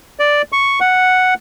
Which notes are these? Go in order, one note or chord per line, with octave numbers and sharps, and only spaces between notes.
D5
C#6
F#5